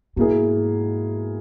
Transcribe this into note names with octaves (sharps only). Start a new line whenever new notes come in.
G#2 B2 A#3 E4 G#4